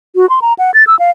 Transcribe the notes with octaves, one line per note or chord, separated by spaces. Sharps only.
F#4
C6
A#5
F#5
A6
E6
F5